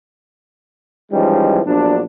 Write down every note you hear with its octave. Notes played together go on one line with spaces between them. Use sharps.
E3 F3 G3 G#3 C#4 D#4
A#1 F#3 B3 D4